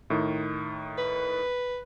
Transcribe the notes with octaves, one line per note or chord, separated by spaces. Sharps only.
A2 D#3
B4